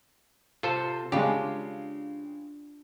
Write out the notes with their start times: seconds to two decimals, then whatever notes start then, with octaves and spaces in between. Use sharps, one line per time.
0.63 C3 F4 A4 C5
1.12 C#3 G#3 D4 F4 G4